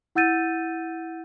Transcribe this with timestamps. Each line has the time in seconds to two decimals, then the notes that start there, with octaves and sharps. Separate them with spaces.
0.15 E4 F#5 E6 G6 A6 D#7